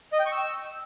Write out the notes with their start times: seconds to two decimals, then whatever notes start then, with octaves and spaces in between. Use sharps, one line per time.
0.13 D#5
0.19 G5
0.26 C#6
0.32 E6